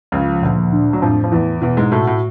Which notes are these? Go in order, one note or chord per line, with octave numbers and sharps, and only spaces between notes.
C#2 C#3 F3
D2 A#2 D3
D4
F#3
F2 A2 F3
F3
E2 E3 E4
E2 B2 E3
G#2 G#3
A2 A3 F#4
A2 A3